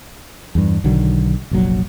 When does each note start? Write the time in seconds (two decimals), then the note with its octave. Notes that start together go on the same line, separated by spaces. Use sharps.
0.55 E2 G2
0.84 B1 D3 D#3 F#3
1.51 F1 A#1 F#3